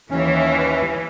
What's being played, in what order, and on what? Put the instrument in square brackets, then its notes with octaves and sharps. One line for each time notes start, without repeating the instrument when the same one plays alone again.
[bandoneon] D#2 C#4 [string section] E3